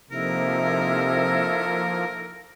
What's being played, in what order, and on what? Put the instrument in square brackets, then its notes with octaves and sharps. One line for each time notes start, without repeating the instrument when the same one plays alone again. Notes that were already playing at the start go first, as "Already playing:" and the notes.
[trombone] C3 [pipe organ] F3 A#3 [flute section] D#4 E4 A4 [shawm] A#4